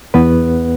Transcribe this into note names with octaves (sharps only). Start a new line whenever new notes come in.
E2 B3 B4